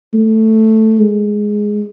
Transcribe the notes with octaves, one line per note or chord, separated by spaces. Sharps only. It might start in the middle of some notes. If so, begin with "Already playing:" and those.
A3
G#3